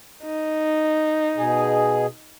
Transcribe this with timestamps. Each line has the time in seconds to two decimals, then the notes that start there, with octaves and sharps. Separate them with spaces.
0.24 D#4
1.37 B2 G#4